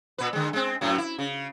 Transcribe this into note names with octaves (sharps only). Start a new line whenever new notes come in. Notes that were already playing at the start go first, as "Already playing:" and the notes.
A#2 B4
D3 G#3
G#3 C4
F#2 A2 F#3
E4
C#3